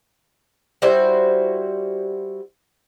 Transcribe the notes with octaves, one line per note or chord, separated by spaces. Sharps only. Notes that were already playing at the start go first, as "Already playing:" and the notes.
G3 E4 F#4 C5